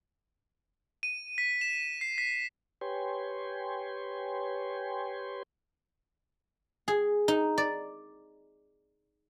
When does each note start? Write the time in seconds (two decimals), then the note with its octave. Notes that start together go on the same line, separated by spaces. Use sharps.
1.03 D#7
1.38 B6
1.61 E7
2.01 C7
2.18 B6
2.81 G4 B4 C#5 G5 G#5 C6
6.88 G#4
7.28 D#4
7.58 D5